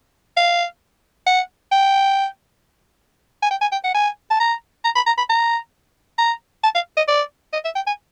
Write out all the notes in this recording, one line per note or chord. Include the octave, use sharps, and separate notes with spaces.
F5
F#5
G5
G#5
G5
G#5
G5
F#5
G#5
A5
A#5
A#5
B5
A#5
B5
A#5
A#5
A5
F5
D#5
D5
D#5
E5
G5
G#5